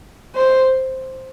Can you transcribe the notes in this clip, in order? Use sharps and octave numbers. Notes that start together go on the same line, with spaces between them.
C5